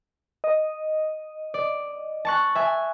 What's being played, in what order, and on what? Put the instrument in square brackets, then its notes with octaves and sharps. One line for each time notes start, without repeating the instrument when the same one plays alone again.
[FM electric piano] D#5
[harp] D5
A5 C#6 F#6
E5 G#5